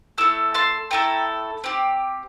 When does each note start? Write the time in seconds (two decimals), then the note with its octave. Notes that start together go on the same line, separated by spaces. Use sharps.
0.18 A3 E4 A4 E6
0.54 A5 C6
0.91 A3 E4 A4 G5 A#5
1.64 C4 G4